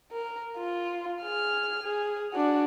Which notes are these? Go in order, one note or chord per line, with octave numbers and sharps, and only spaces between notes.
A#4
F4
G#4 F6
G#4
D4 F#4